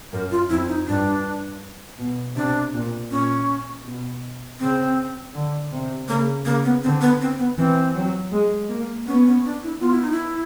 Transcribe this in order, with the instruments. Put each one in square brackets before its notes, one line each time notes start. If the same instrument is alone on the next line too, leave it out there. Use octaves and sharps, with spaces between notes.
[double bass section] F#2 [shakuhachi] A#4
[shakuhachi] F4
[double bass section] F2 [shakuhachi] E4
[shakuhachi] D#4
[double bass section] G2 [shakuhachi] D4
[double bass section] B2
[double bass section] C3 [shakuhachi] D4
[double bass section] A#2
[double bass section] A#2 [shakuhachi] C#4
[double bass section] B2
[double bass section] C#3 [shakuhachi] C4
[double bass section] D3
C3
[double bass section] C#3 [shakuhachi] A#3
[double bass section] C#3 [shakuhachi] A#3
[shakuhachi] B3
[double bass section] D3 [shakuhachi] C4
[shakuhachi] B3
C4
B3
[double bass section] E3 [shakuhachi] C4
[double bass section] F#3
G#3
A#3
[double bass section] B3 [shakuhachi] C#4
[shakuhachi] C#4
D4
E4
[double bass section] B3 [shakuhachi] F4
[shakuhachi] E4
D#4
E4